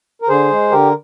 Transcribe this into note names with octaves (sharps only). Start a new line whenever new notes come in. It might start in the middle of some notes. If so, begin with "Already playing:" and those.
A#4
D3 G#4 C5
G#3
D3 G4 A#4